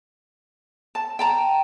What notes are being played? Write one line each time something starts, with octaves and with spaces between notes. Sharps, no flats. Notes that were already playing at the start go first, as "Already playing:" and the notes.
A5
G5 A5 A#5